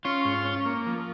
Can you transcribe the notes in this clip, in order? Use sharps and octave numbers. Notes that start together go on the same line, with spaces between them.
C#4 F4
G#2
C#4
A#3
F3